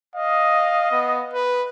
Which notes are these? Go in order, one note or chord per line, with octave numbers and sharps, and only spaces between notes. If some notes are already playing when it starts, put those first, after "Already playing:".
D#5 F5
B3
B4